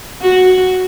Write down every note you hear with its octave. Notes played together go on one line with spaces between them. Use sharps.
F#4